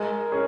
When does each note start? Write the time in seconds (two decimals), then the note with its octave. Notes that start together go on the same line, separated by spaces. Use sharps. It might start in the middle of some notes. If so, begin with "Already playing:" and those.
Already playing: G#3 A#4
0.32 C#4 G#4